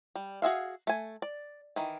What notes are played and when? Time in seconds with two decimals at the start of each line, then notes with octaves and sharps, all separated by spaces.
0.15 G3
0.42 F#4 G#4 E5 F5
0.87 A3 G#5
1.22 D5
1.76 D#3 E3